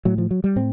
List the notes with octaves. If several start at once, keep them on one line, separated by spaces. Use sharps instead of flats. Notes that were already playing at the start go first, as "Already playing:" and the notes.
A2 F#3
F3
F#3
G3
A2 C4